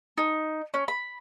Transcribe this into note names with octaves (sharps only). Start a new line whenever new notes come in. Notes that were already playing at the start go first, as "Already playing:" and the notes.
D#4
C#4
B5